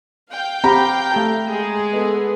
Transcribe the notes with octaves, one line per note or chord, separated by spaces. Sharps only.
F5 G5 G6
C4 G4 F#5 A#5 B5
A3 G4 A5
G#3 G#4
B3 A4 D#5